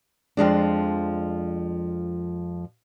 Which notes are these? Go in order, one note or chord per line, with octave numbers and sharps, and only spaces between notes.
F2 F3 G#3 D4